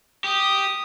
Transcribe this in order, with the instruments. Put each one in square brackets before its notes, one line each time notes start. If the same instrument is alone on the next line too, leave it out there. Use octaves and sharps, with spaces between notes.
[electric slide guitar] G4 [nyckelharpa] D#6